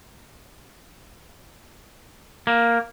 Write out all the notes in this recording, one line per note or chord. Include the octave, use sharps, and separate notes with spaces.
A#3